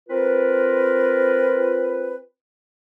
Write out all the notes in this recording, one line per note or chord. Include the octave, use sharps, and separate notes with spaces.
C4 F4 A#4 B4